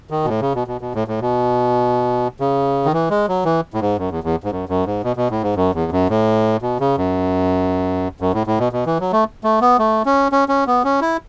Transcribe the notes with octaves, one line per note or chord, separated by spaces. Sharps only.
D#3
B2
A2
C#3
B2
B2
B2
A2
A2
B2
C#3
D#3
E3
G#3
F#3
E3
A2
G#2
F#2
E2
E2
G#2
F#2
F#2
G#2
B2
B2
A2
G#2
F#2
E2
F#2
A2
B2
C#3
F#2
F#2
A2
A2
B2
B2
E3
F#3
A3
A3
B3
A3
C#4
C#4
C#4
B3
C#4
E4